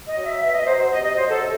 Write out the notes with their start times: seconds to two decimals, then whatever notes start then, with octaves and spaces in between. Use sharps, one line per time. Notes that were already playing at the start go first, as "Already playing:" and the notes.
0.09 D#5
0.17 F#3
0.25 E5
0.42 B2 E5
0.54 D#5
0.67 F#3 C5
0.79 C5
0.91 C3 D#5
1.04 D#5
1.17 F#3 C5
1.29 A4
1.41 C3